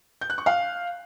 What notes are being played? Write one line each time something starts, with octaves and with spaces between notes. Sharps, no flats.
G6
F#6
C#6
F5